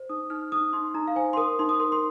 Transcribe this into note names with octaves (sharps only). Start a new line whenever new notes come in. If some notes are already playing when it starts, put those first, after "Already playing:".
Already playing: C5
D#4 D#6
D#4 F6
D#4 D#6
D#4 C6
D#4 A#5
F5
C5 G#5
C6
A#4 D#6
D#4 C6
D#6
A#4 C6
C6